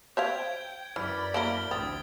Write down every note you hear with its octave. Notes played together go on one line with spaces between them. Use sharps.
C5 E5 F5 G5 G6 G#6
F#2 E3 D5 B5 F6
A#3 E4 A#4 D7 G7
A1 D2 C4 D#6 A6